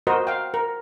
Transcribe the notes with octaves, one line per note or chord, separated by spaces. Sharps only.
F#4 A#4 C5 D#5
F5 G5
A#4